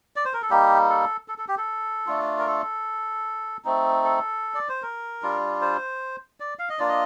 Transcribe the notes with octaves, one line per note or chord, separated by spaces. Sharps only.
D5
C5
A#4
A4
G3 A#3 D#4 G4
A4
A4
A4
G4
A4
A3 D4 F4
A#4
A4
A3 C4 D#4
A4
D5
C5
A#4
G3 D4 F4
C5
D5
F5
D#5
A#3 D4 F4 D5
D#5